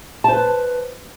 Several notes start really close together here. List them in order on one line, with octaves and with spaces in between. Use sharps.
A5 C5 B4